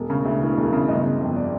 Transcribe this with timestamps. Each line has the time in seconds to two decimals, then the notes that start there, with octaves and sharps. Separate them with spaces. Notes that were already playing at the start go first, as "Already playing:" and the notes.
Already playing: E1
0.10 C#3
0.25 D2
0.42 E3
0.57 E1
0.73 C#3
0.88 G1 D#5
1.05 C#3
1.21 F2
1.36 D5